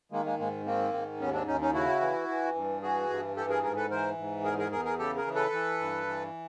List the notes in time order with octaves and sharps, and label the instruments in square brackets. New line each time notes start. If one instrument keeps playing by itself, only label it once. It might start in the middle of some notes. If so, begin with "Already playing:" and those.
[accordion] D#3 G#3 A#3
G#3 A#3
G#2 G#3 A#3
D#3 A#3 C4
G#2
D#2 B3 C#4
C4 D4
D#2 C#4 D#4
C#4 D#4
C#3 E4 F#4
E3
E3
G2
E3 F#4 G#4
G2
E3 G4 A4
G#4 A#4
G#2 G#4 A#4
A4 B4
E3 A#4 C5
G#2
E2 G#4 A#4
G#4 A#4
E2 G#4 A#4
G#4 A#4
C#3 G4 A4
G#4 A#4
E3
A4 B4
E3
G2
E3